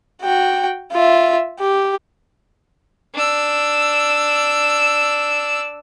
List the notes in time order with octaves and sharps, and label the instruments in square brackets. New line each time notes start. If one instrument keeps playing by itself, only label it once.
[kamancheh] F#4 G5
F4 E5
G4
[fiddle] D4 E6